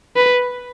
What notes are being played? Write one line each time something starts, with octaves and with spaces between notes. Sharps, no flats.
B4